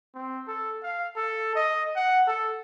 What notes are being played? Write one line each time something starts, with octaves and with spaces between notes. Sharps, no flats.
C4
A4
F5
A4
D#5
F#5
A4